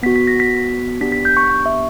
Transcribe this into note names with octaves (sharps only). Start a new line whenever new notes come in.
B3 F#4 B6
B6
A#6
B6
B3 D4 G4 B6
B6
G6
C#6
C#6
E5